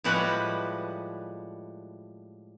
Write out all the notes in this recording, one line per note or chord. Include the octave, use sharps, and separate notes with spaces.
A2 F3 G3 G#3 F#4 B4